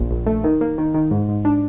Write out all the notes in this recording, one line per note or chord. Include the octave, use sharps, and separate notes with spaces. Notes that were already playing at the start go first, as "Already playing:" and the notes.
Already playing: A#1 A#2
A#1
A3
D#3
A#3
D#3
D#3
G#2
G#2
D4